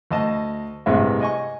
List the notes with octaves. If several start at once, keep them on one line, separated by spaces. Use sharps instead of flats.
D2 D#5 A5
A1 G2 C3 G#3 B4 E5
D#5 G#5 C#6